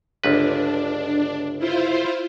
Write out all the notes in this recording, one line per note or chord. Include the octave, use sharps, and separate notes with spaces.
G1 C#2 D4 B4
E4 F4 C5